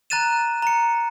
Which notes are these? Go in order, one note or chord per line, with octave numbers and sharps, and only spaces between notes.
A#5 F#6 A6 D#7 E7
A#5 C#7